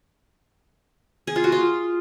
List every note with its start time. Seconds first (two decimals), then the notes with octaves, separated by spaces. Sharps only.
1.27 G#4
1.36 F4
1.44 F#4
1.52 F4